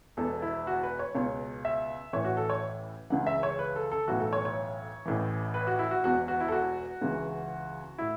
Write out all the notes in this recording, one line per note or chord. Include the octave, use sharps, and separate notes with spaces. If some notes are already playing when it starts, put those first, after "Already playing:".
E1 E2 B2 A4
E4
F#4
B4
C#5
C#2 B2 C#5
E5
A1 A2 E3 C#5
F#4
A4
C#5
C#2 C#3 E3 F#5
E5
C#5
B4
A4
A4
B1 A2 E3 F#4
A4
C#5
C#5
A1 A2 E3
B4
F#4
E4
F#4
E1 E2 B2 F#4
F#4
E4
A4
F#4
C#2 C#3 E3
A2 E4